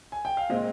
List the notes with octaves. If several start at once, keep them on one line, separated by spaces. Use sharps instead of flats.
G#5
G5
F5
A#2 G#3 C4 D#5